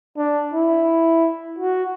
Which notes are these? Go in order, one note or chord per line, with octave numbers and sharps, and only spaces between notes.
D4
E4
F#4